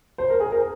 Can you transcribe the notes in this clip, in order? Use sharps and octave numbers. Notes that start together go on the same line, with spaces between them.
C5
A#4
G#4
A#4